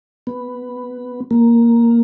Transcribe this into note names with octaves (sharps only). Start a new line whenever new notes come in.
B3
A#3